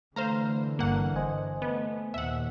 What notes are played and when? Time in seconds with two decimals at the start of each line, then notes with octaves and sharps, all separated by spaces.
0.16 D3 E3 A3 C5 F5 A#5
0.79 G1 G2 A#3 F#5
1.16 C5 D#5 G#5
1.62 A3 B3
2.14 D#2 A#2 E5 F#5